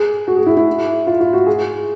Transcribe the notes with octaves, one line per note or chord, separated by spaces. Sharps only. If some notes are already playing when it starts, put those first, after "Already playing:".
Already playing: G#4
F#4
G#4
E4
E4
F4
F4
F#4
G#4